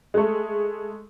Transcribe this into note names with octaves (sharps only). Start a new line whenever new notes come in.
G#3 A3